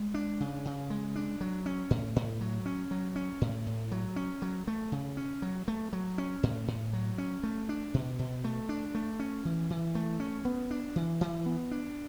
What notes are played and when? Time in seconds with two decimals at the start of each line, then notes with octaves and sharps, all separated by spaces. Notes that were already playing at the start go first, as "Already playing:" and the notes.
Already playing: G#3
0.14 D4
0.40 C#3
0.65 C#3
0.90 G#3
1.16 D4
1.41 F#3
1.66 C#4
1.90 A2
2.16 A2
2.41 F#3
2.66 C#4
2.91 F#3
3.16 C#4
3.41 A2
3.67 A2
3.92 F#3
4.16 C#4
4.42 F#3
4.67 A3
4.92 C#3
5.17 C#4
5.42 F#3
5.68 A3
5.93 F#3
6.18 C#4
6.43 A2
6.68 A2
6.93 F#3
7.18 C#4
7.43 A3
7.69 D4
7.94 B2
8.19 B2
8.44 A3
8.69 D4
8.95 A3
9.20 C#4
9.45 E3
9.70 E3
9.95 A3
10.20 C#4
10.45 B3
10.71 D4
10.96 E3
11.21 E3
11.46 B3
11.71 D4